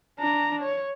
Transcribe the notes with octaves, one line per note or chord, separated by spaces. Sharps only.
D4 A#5
C#5